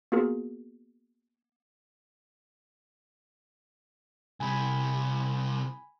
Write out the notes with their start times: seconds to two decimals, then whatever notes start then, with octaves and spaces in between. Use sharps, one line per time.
0.12 A#3 B3 F4 F#4 G#4 A#4
4.40 C2 C3 G#5 B5